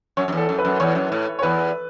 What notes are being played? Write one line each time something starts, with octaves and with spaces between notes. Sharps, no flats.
F#2 C#5
F#2
E2 A4
F#2
B4
F#2
E2 C#5
F#2
A2
C#5
E2 B4